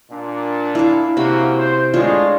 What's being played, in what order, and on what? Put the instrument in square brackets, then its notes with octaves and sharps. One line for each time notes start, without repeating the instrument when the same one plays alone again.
[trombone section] A#2 D4
[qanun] E4 F5
[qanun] C3 E5 B5 [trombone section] A#3 C#4 F#4
[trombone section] C5
[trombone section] A2 G#3 [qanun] D4 F4 C#5